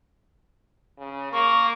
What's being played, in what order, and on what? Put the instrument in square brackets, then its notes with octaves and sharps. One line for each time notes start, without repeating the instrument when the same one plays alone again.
[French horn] C#3
[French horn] A#3 [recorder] C#6